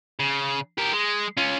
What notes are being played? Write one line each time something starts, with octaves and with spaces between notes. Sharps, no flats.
C#3
G4 A#4
G#3
C#4 F4